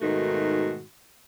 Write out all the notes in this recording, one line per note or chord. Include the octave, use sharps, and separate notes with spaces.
G#2 B2 D#3 A3 F#4